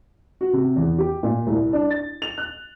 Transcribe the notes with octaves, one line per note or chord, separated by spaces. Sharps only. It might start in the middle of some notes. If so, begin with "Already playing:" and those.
F#4
C3
E2
G4
A#2
C2
D4
A6
F7
F#6